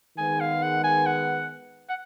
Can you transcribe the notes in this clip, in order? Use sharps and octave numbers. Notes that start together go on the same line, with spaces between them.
D#3 G#3 B3 G#5
F5
F#5
G#5
F#5
F#5